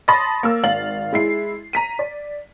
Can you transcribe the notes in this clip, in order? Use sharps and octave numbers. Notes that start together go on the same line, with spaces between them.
A5 B5 C6 D#6 A6 A#6
A#3 E6
G#1 F5 A6 F#7
G#3 E4 C7
A#5 B6 D#7
D5